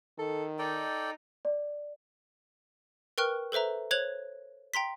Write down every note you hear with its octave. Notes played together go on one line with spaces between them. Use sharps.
D#3 A4
D#4 A4 D5 G5
D5
A#4 B4 G5 C#6 F6 F#6
A4 B4 C5 E5 A#5
C5 C#5 F#6 G#6 F7 F#7
G5 A#5 C6 B6